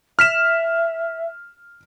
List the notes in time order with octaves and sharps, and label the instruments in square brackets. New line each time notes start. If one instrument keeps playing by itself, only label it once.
[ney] E5 [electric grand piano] F6 B6 E7